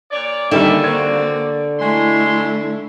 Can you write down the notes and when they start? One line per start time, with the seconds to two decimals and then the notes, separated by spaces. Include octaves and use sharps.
0.11 A#2 C#5 D5
0.51 D3 D#3 G3 A#3 C#4 D4 E5
0.84 C4 F#4 D5 G#6
1.80 G#3 A3 E4 F#4 C6